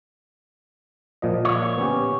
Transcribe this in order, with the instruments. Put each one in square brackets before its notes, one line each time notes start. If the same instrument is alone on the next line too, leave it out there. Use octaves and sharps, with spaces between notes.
[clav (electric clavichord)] A#2 F3 D#5
[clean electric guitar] C#5
[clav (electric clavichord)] B3 C#4 G4